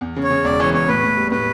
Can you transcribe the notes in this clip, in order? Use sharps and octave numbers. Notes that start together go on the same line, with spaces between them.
E2
C#3
C#5
C#3
E1 D5
E3 C#5
E2 C#5
A2 B4
A2
G3
A2 B4